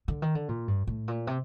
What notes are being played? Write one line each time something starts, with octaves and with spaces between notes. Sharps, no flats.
D3
D#3
D3
A#2
G2
A2
A#2
C3